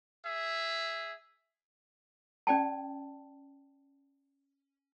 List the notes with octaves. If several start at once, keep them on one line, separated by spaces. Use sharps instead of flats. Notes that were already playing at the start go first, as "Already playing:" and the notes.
G#4 E5
C#4 D5 G5 A5